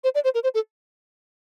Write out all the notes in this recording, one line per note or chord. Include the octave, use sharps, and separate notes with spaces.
C5
D5
C5
A#4
C5
A4